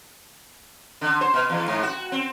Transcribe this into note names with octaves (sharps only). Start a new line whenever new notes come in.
D3
C5
B2
E2
G#2
F#4
C4